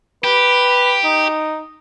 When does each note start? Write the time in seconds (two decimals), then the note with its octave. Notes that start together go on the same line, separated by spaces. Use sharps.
0.24 G4 B4
1.04 D#4